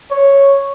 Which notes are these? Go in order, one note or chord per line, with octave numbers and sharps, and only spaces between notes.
C#5